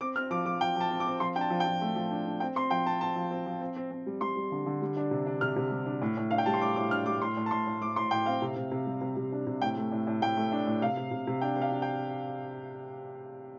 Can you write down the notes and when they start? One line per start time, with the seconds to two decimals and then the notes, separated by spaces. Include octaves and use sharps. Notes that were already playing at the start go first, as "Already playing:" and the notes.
0.01 C4 D6
0.16 C4 F6
0.31 F3 D6
0.46 F3 D6
0.61 F3 G5
0.76 F3 A5
0.90 C4
1.00 D6
1.06 C4
1.20 F3 C6
1.35 D4 G5
1.41 A5
1.50 F3
1.60 G5
1.66 F3
1.81 A3
1.96 F3
2.11 D4
2.26 D4
2.40 C4 G5
2.56 C4 C6
2.71 F3 G5
2.86 C4 A5
3.01 C4 A5
3.16 F3
3.31 C4
3.46 F3
3.61 C4
3.76 C4
3.91 C4
4.06 G3
4.21 G3 C6
4.36 G3
4.52 D3
4.66 D3
4.82 G3
4.97 D4
5.11 C3
5.26 D4
5.41 C3 F6
5.56 C3
5.71 G3
5.86 D4
6.02 A2
6.17 A2
6.31 D4 F5
6.38 G5
6.46 G3 A5
6.54 C6
6.61 A2 D6
6.76 A2 D6
6.91 D4 F6
7.06 G3 D6
7.22 A2 C6
7.37 A2
7.46 A5
7.51 A2 C6
7.67 A2
7.81 A2 D6
7.96 A2 C6
8.11 A2 G5
8.26 C4 F5
8.42 C3
8.56 C3
8.71 C3
8.86 G3
9.01 C3
9.16 C3
9.32 D4
9.47 C3
9.62 A2 G5
9.77 A3
9.91 A2
10.07 A2
10.22 A2 G5
10.37 A3
10.52 D4
10.66 A2
10.82 C3 F5
10.97 C3
11.11 C3
11.27 C3
11.41 D4 G5
11.56 C3
11.61 F5
11.72 D4
11.82 G5